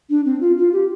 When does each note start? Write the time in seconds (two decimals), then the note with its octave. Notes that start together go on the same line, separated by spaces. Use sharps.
0.10 D4
0.25 C4
0.41 F4
0.58 F4
0.73 G4